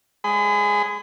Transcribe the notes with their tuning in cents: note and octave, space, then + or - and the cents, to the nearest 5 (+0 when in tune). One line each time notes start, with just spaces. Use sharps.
G#3 +0 G#4 +0 B5 +45